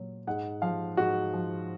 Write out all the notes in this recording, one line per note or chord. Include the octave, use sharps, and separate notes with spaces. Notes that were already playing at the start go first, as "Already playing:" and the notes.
Already playing: A#2 F#3
G#2 F#5
F3 F5
G#2 F#4
F3